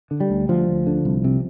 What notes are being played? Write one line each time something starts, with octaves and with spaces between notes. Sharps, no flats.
D3
G3
D2
D2 F3
D2
D3
C2
C3